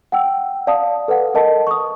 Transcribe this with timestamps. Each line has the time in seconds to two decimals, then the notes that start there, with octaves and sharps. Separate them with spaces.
0.12 F#5 G5 E6
0.67 D5 F5 A5 D#6
1.08 A4 B4 F5 F#5
1.34 A4 A#4 D#5 A5
1.67 C#6 D#6